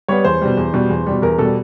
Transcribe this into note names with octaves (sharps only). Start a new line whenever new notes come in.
G3 B3 C#5
E2 C5
B2 G3
E2
B2 G3
E2
B2 G3
E2 A#4
B2 G3 A4